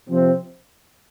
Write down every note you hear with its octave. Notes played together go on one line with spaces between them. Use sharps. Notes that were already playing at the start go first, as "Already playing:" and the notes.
C3 F3 C4